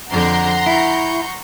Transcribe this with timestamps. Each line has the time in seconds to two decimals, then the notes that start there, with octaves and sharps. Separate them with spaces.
0.10 F2 D3 F#5 A#5 C6 G6
0.66 E4 C#6 G6